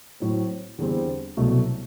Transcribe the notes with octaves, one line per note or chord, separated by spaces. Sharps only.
A2 F#3 C4
E2 D3 G3 C4
C2 B2 F#3 A3